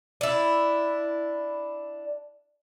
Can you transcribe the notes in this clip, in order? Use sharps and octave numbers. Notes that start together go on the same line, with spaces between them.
D4 E4